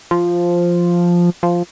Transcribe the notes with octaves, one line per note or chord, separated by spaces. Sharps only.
F3
F3